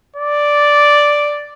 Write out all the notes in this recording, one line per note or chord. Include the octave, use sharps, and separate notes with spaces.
D5